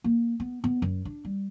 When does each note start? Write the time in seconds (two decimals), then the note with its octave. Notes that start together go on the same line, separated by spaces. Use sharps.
0.04 A#3
0.40 B3
0.64 B3
0.82 F#2
1.05 D4
1.25 G3